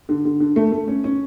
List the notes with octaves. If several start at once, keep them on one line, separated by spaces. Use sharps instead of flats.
D3
D3
D3
A3
A3
C#4
C#4